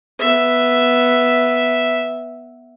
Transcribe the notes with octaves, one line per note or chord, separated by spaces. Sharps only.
B3 E5